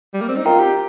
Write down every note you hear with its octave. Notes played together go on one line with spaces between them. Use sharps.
G3
A#3
C4
D#4
F4 A#4 G5 A#5
G4